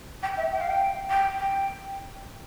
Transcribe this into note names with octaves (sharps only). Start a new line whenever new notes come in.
G5
E5
G5
F5
G5
G5
G5